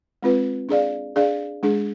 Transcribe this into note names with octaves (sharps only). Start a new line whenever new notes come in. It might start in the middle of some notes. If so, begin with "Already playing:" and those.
G#3 C4 F4 B4
D4 G#4 D5 F5
D4 G#4 D5 F5
G#3 D4 G#4